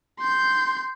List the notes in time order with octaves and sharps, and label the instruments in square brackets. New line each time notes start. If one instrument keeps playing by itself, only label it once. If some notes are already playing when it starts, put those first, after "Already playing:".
[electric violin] C6 G6